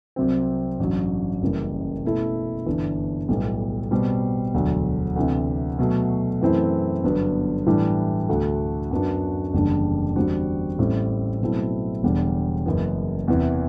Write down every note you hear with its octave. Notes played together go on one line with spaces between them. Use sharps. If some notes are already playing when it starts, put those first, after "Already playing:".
C2 C3 F#3 C4
A1 G2 F#3
F#1 F#2 E3 G3
B2 A3 E4 A4
G1 G2 E3
B1 A2 G3 B3
B2 G3 C4
E1 D2 D3 F#3
D2 C3 E3
B2 F#3 A3
F#2 E3 A3 C4 E4
G1 G2 F#3 B3
A2 E3 G3 D4
D2 D3 A3 D4 F#4
F#2 F#3 B3 D4 F#4
F#1 E2 D3 G3 D4
E2 D3 G3 C4 F#4
A1 A2 G3 C4
B2 F#3 A3 C4 E4
E1 E2 D3 G3
F#1 F#2 E3 B3
E2 C3 E3